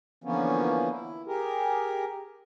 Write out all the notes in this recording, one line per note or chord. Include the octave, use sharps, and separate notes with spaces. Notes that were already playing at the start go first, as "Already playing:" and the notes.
D3 E3 F3 A#3 B3 C#4
E4
G4 G#4 A#4